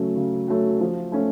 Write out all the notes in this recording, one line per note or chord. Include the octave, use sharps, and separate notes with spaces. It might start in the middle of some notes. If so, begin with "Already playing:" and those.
Already playing: C#3 F#3 A3 C#4
C#3
F#3 A3 C#4
F3
A3 C#4